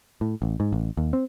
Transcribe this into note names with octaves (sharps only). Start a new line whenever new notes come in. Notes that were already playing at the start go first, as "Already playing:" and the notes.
A2
A1
G#2
A1
D#2
C4